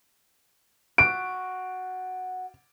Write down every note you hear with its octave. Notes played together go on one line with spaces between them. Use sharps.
F#4 D7